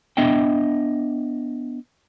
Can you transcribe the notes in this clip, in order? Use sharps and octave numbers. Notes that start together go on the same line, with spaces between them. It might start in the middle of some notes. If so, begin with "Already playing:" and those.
B3 D4 D#5 E5 G5